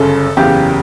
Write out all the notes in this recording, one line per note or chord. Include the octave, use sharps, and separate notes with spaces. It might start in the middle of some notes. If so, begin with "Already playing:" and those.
Already playing: G1 F#2 C#3 A4
F#1 E2 C#3 G4